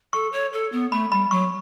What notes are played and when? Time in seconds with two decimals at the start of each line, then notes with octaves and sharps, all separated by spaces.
0.13 A4 C#6
0.33 C#5
0.53 A4
0.72 B3
0.92 A3 B5
1.12 G3 B5
1.31 F#3 C#6